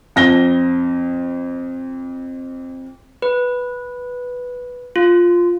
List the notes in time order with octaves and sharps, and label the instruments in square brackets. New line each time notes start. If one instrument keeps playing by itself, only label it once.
[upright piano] F2 A#6 G7
[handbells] B4
F4